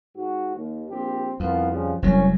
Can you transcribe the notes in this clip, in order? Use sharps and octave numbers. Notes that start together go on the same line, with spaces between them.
G#2 F#4
D#2
A#1 C4 G4
C2 F2 B3 F4
C#3 F3 G3
F1 C2 F#3 G3 C#4